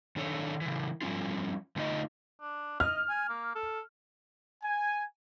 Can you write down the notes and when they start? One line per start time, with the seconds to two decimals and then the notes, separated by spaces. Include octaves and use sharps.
0.16 D#3 D4 A4 C#5
0.61 C#3 E3
1.02 F3 G3 C#4 F4
1.76 D3 A3 D#4 F4 C#5 D#5
2.41 D4
2.80 D#5 F6
3.09 G#5
3.29 A#3
3.55 A4
4.64 G#5